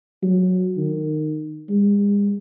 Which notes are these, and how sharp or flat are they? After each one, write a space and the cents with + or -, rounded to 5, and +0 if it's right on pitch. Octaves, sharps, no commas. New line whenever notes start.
F#3 -10
D#3 -20
G#3 -40